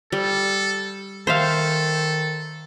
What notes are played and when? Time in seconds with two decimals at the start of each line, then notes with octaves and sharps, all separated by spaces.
0.12 G3 A4
1.27 D#3 A4 C5 E5 F5